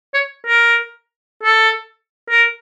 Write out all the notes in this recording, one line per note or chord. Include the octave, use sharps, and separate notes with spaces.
C#5
A#4
A4
A#4